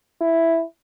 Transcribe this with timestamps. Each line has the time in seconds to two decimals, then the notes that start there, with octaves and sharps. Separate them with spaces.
0.21 E4